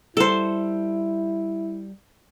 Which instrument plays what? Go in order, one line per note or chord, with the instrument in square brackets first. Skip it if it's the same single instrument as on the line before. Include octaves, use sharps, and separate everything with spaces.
[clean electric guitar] G3 [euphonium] E4 [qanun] A4 C5